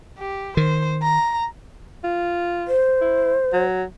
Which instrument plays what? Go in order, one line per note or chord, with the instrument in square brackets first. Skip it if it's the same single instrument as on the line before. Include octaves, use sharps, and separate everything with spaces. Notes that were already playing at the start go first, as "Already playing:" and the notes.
[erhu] G4
[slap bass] D#3 [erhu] C5
[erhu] A#5
[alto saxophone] F4
[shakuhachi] C5
[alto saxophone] E4
F#3